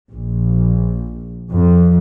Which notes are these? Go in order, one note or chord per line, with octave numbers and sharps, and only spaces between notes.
A#1
F2